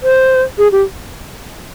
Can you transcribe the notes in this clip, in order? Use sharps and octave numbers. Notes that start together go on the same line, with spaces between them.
C5
G#4
G4